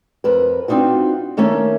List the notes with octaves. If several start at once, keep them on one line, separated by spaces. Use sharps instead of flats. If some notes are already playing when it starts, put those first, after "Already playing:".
F2 A#4 B4
C4 D4 D#4 F4 F#4
D#3 A3 A#3 C#4